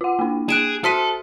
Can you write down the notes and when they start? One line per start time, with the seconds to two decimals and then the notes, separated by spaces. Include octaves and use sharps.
0.01 F4 F#5
0.19 A#3 D4
0.49 G#4 F#6 D7 E7
0.84 F#4 A4 E5 C6 F6 B6 D#7